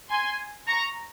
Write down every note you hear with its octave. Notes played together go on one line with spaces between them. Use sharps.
G#5 C6
A#5 C#6